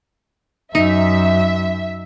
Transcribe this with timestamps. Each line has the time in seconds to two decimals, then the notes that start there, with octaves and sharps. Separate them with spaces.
0.75 F#2 D#4 E5